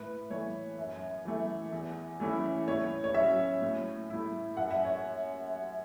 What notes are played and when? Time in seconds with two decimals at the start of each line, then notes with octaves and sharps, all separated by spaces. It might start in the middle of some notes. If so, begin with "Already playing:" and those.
Already playing: A2 B4
0.30 E3 A3 C#5
0.78 F#2
1.25 E3 A3
1.73 E2
2.20 E3 A3 C#4 E4
2.68 A2 C#5
3.04 C#5
3.14 F#3 C#4 E5
3.62 A2
4.10 A3 E4
4.57 F#2 F#5
4.71 E5
4.85 C#5